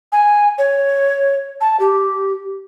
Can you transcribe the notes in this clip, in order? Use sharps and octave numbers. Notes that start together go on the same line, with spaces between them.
G#5
C#5
A5
G4